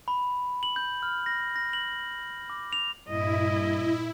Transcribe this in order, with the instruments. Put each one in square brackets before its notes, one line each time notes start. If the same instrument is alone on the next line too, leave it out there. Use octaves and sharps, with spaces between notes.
[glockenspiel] B5
F#7
G6
F6
A#6
A#6
F#7
D6
F7
[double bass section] G2 A#2 [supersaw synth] E4 [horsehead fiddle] D#5